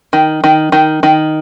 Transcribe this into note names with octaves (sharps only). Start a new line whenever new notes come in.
D#3
D#3
D#3
D#3